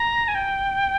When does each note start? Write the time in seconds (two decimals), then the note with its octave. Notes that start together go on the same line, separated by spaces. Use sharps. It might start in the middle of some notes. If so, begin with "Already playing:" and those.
Already playing: A#5
0.28 G#5
0.35 G5